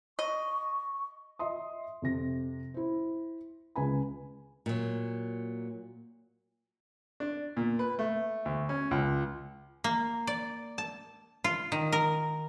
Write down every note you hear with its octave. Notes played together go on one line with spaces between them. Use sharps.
D#5 C#6
D#5 E5 C6 D#6
F2 C3 A#6
E4 C5
C#2 B4 G#5 B5
A#2 F#3
D4
A#2
B4
A3
D2
C#4
C#2
A#3
D5
A5
F4
D#3
A#4